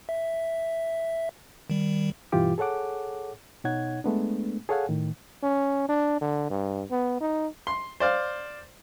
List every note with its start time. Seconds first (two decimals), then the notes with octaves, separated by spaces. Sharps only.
0.09 E5
1.70 D#3 G3
2.32 G2 B2 E3 F4 G4 D6
2.58 G#4 A4 C#5 F#5 D6
3.65 B2 D#4 C#5 F#5 G#6
4.04 G#3 A3 B3 D4
4.69 G#4 A4 C#5 F5 F#5 G#5
4.89 A2 D#3
5.43 C#4
5.89 D4
6.21 D3
6.50 G2
6.91 B3
7.20 D#4
7.67 C6
8.00 C5 D5 F5